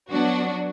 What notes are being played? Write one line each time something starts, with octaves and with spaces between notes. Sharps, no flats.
F#3 B3 D4 F#4